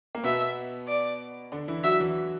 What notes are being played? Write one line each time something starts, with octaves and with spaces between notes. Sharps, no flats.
A#3
B2 B3 E5
D5
D3 D4
E3 E4
F#3 F#4 E5
E3 E4